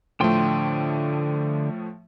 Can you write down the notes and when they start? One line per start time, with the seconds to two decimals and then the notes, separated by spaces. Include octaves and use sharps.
0.20 A2 D3 F3 A3 G5 C6